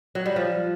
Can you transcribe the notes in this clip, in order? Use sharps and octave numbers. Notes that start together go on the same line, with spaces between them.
F#3
G3
F3